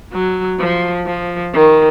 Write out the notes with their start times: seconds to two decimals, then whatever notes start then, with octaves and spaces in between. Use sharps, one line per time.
0.13 F#3
0.60 F3
1.07 F3
1.53 D#3